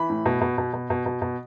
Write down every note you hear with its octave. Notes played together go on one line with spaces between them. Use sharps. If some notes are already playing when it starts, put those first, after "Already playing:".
Already playing: E3 B5
A2
B2
B2
B2
B2
B2
B2
B2